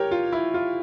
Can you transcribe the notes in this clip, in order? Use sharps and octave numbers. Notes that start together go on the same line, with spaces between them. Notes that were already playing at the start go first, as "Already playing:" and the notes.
Already playing: G4 A#4 C#5
F4
E4
F4